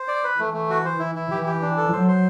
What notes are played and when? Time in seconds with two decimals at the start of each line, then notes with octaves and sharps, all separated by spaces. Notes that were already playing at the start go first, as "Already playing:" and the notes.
Already playing: C5
0.08 D5
0.24 B4
0.38 E3 A3
0.54 A3
0.70 F#4
0.85 C5
0.99 E4
1.15 E4
1.31 E3 G4
1.46 G4
1.62 D4
1.77 A4
1.92 F#3 C5
2.08 C5